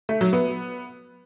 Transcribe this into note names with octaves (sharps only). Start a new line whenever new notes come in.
A3
F#3
B3